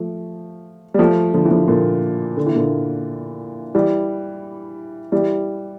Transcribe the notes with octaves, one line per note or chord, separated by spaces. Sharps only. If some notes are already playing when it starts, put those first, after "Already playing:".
Already playing: F3 A3
G3
F3 A3
D3 F3
E3
D3 F3
A#2 D3
D3
E3
A#2 D3
E3 G3
E3 G3